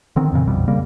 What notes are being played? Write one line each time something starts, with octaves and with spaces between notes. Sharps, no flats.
D3 D#3 C4
F2 A#2 C#3 E3
A#1 F2 B2 G3
C#3 G3 A#3